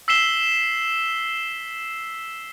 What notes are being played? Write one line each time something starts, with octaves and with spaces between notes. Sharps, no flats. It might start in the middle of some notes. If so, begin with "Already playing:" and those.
E6 B6 C7 E7 G7